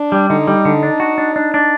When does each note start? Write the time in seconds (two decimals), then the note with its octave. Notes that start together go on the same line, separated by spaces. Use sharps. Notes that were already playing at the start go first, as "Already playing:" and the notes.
Already playing: D4
0.12 G3
0.30 D3 D#4
0.47 G3
0.65 D3
0.83 D4
1.00 F#4
1.18 D4
1.36 D4
1.54 D4